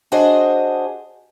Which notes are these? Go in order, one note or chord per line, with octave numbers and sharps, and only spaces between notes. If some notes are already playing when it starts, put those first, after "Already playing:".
D4 F#4 G#4 C5 D#5